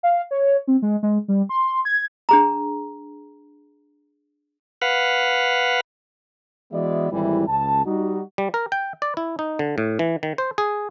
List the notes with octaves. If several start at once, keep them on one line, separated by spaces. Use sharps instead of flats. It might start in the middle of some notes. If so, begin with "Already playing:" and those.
F5
C#5
C4
G#3
G#3
G3
C6
G#6
D4 G#4 A#5
B4 F5 F#5
E3 G#3 B3 F#4 D5 E5
G#1 D#2 E3 G3 E4
C#2 A5
G3 D#4 F#4
G3
A#4
G5
D5
E4
D#4
D3
A2
E3
D#3
C5
G#4